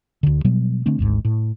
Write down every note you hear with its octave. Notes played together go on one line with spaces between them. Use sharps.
D2 D3
B2 F#3 G3 B3
D3 A3 C4 D4
G#1 D2 G#2
A2